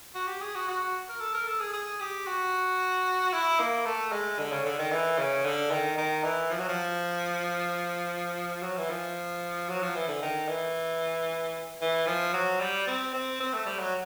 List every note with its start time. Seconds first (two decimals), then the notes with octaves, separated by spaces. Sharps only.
0.15 F#4
0.28 G4
0.41 G#4
0.55 F#4
0.68 F#4
1.09 A#4
1.21 A4
1.34 A#4
1.47 A4
1.60 G#4
1.74 G#4
2.00 G4
2.27 F#4
3.33 E4
3.60 A#3
3.86 A3
4.12 G#3
4.39 D3
4.52 C#3
4.65 D3
4.79 D#3
4.92 E3
5.19 C#3
5.45 D3
5.71 D#3
5.98 D#3
6.24 E3
6.51 F3
6.60 F#3
6.69 F3
8.63 F#3
8.78 E3
8.89 F3
9.69 F#3
9.82 F3
9.95 E3
10.08 D3
10.22 D#3
10.49 E3
11.82 E3
12.07 F3
12.33 F#3
12.61 G3
12.87 C4
13.14 C4
13.40 C4
13.54 A3
13.66 G3
13.80 F#3